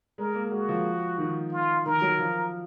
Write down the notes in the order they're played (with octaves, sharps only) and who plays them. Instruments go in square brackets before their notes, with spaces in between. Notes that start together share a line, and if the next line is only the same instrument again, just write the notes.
[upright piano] G#3 [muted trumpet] A#4
[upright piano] A#3
[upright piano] G#3 [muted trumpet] F#4
[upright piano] F3
D#3
[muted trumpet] F4
[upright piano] D#3 [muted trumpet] A#4
[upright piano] F#3
F3